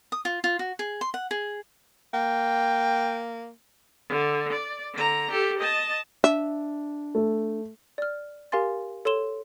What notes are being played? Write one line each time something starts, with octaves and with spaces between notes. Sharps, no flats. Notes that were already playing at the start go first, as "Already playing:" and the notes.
D#6
F4
F4
F#4
G#4
C6
F#5
G#4
A#3 G5
D3
D5
D3 A#5
G4 A4
D#5 A5
D4 E5
A3
D5 F6
G4 A#4 F5 G#5 C6 A6
A4 C#5 C6 E7 G7